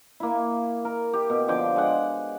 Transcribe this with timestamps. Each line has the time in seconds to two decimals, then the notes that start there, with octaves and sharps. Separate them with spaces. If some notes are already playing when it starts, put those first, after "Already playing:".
0.20 A#3 E4
0.85 A#4
1.13 G4
1.30 B2
1.48 D3 F3 G5 D6
1.76 G#3 F#5